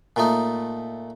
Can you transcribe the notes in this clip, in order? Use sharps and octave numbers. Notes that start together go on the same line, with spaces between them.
A#2 A3 D#4